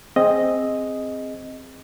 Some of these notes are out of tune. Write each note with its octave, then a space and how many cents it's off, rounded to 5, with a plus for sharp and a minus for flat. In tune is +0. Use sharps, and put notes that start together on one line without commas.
C4 +0 G#4 +0 D#5 +0